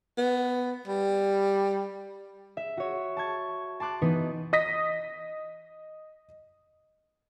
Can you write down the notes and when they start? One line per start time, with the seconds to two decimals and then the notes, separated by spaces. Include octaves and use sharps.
0.17 B3
0.87 G3
2.57 E5
2.77 F#4 C#5
3.17 A5 C#6 G#6
3.80 A5 C6 D6 F#6
4.02 E3 B3 D#4 B4
4.53 D#5 D#6 A#6 B6